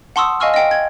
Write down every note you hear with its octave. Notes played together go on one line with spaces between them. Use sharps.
F#5 A5 C6 C#6 D#6 E6
D#5 F5 G#5 C#6 E6 F6
D#5 G5
G#6